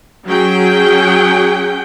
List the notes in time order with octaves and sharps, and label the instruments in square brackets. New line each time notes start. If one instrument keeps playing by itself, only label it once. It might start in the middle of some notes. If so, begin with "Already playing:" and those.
[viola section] F#3 C#4 G#4 G5